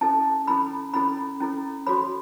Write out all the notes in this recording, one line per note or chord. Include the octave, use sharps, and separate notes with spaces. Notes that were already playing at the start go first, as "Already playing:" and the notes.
C#4 E4 A4 A5
C#4 E4 A4 B5
C#4 E4 A4 B5
C#4 E4 A4
F#4 A4 C#5 B5